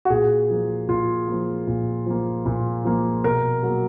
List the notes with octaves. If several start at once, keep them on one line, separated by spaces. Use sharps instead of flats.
F#4
A#2 G#4
F3 A#3
A#2 F4
F3 A#3
A#2
F3 A#3
A#2
F3 A#3
B2 A#4
F#3 A#3